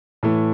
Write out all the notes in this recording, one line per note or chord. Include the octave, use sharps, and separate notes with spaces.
A2 E3 A3